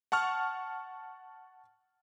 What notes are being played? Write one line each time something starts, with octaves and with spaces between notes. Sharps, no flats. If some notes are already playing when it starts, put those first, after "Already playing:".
F#5 A5 C#6 F6